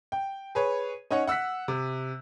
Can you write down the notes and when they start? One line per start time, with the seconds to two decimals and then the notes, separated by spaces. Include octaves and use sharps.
0.12 G5
0.55 G#4 B4 C#5
1.10 C#4 D#4 C#5 F#5
1.27 F#5 E6 F#6 B6
1.68 C3